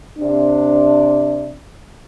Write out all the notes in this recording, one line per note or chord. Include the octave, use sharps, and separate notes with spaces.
C3 D4